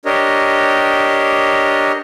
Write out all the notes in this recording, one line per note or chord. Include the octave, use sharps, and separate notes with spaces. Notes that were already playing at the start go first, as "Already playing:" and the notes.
D4 G4 A#4 C#5 D#5